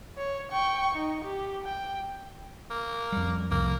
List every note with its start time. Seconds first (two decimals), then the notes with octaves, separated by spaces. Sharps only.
0.17 C#5
0.52 G5 C#6
0.95 D#4
1.24 G4
1.64 G5
2.71 A#3
3.12 F2 G3
3.51 C2 F2 A2 A#3